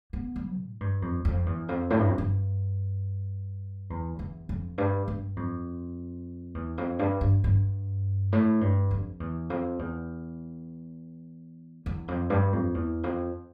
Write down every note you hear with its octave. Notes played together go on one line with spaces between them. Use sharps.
B3
G3
A2
G2
F2
F2
E2
F2
A2
G2
F2
G2
E2
E2
F2
G2
G2
F2
E2
F2
G2
G2
G2
A2
G2
F2
E2
F2
E2
E2
F2
G2
F2
E2
F2